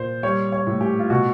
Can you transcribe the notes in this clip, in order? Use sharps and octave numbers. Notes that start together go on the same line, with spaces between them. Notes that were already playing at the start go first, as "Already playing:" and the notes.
Already playing: A#2 C5
G3 C#5
C#5
A2
G4
F4
B2 F#4